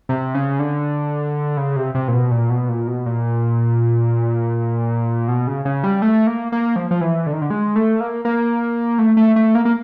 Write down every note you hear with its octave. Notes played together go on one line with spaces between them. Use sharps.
C3
C#3
D3
C#3
C3
C3
A#2
B2
A#2
B2
A#2
B2
A#2
B2
C#3
C#3
G3
A3
A#3
A#3
F3
F3
E3
D3
D#3
D3
G#3
A3
A#3
A#3
A3
A3
A3
A#3
A#3